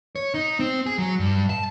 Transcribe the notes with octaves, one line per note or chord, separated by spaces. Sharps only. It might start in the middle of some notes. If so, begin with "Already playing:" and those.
C#5
D#4
C4
G#4
F#3
G2
A5